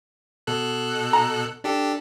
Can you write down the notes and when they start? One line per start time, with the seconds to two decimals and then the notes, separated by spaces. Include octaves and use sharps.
0.47 B2 A4 F#6
1.13 A#5
1.64 D4 G4 A4